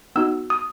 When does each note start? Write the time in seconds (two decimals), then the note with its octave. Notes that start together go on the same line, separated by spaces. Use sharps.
0.16 B3 D#4 F#4 E6
0.50 D#6